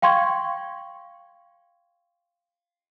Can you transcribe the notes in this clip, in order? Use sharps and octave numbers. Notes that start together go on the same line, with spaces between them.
F5 G5 C6 C#6 G#6